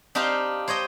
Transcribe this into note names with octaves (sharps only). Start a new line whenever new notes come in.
D4 D#4 G4 C5 F5 C6
C5 C#5 D#5 G5